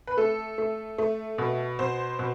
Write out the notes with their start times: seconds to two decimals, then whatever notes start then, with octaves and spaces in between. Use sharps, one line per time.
0.07 B4
0.17 A3 A4
0.58 A3
0.98 A3
1.38 B2
1.79 B2 C5
2.19 B2